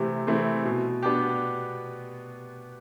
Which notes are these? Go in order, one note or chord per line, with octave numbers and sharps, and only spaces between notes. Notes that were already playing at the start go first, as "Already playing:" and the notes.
Already playing: C3 E3 A3 C4
E3 A3 C4
B2
B3 D4 G4